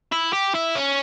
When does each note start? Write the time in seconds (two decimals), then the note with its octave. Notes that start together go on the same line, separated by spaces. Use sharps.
0.12 E4
0.33 G4
0.54 E4
0.75 C#4